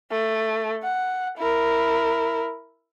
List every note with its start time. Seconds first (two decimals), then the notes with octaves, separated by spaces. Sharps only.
0.11 A3
0.83 F#5
1.38 E4 A#4